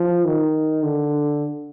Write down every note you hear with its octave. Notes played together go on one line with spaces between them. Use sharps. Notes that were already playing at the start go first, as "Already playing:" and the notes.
Already playing: F3
D#3
D3